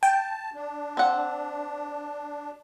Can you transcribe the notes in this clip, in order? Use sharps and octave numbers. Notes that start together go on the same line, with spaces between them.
G5 A5
D4
C4 F#5